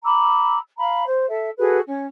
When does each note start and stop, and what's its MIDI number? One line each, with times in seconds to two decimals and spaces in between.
0.03 0.58 82
0.03 0.58 83
0.03 0.58 86
0.03 0.58 88
0.77 1.03 77
0.77 1.03 82
0.77 1.03 83
1.05 1.28 72
1.29 1.49 69
1.29 1.49 76
1.58 1.79 66
1.58 1.79 68
1.58 1.79 69
1.58 1.79 71
1.86 2.04 61